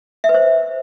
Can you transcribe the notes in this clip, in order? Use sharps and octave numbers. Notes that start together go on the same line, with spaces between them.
E5
B4
C5